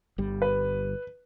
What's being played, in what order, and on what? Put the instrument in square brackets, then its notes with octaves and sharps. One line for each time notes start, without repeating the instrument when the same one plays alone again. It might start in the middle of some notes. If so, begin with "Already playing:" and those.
[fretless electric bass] G1 G3
[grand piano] B4